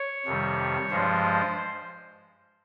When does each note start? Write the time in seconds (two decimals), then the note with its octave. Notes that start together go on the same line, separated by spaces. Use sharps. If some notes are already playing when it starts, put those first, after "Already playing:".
Already playing: C#5
0.25 F2 C3 D#3 G3
0.90 G2 F3 G#3 C5